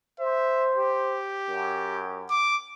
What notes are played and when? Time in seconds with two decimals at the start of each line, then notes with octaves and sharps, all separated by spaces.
0.20 C5 E5
0.75 G4
1.49 F#2
2.30 D6